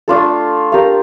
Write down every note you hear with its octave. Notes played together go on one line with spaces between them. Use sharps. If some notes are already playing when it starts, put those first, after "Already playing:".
A3 D4 F4 A4
D4 G4 A#4 F5